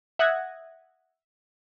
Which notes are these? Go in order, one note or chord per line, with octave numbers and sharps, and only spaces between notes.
E5 F#5 D#6 F#6 G#6 A#6